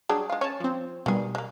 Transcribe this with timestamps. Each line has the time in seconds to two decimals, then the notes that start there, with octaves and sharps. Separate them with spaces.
0.09 F#3 G3 D4 G#4
0.30 G#3 F4
0.41 C#4 C#5 A5
0.60 F3 C4
1.06 B2 D#3 G3 G#4
1.35 G#3 A#3